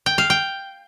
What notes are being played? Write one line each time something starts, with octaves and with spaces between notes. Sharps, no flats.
G5
F5
G5